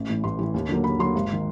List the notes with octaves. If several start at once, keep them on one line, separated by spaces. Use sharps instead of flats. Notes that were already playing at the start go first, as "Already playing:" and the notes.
Already playing: A1
A2 E3
A1 C6
A2 E3
D#2
D3 F#3 A#3
D#2 B5
D3 F#3 A#3 C6
G#1
D#3